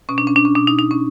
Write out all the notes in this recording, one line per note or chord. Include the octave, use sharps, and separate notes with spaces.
B2 C#4
D4
C#4
D4
C#4
B2 D4
D#4
D#4
C#4